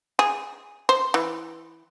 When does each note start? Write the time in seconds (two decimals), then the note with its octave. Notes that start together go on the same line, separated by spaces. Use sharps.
0.19 G#4
0.89 C5
1.14 E3